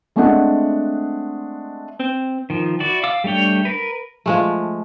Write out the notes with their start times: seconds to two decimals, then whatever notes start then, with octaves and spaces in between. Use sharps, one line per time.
0.16 G#3 A3 C4 D4 D#5 F#5
1.99 C4
2.50 D#3 F3
2.80 E4 F#4 D5
3.03 F5 D6 E6
3.24 G3 A3 D4 C#5 G5
3.65 A#4 B4
4.26 F3 G#3 A3